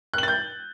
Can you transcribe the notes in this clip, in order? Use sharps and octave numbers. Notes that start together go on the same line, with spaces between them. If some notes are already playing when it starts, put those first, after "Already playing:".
F#6 G6 A6 F#7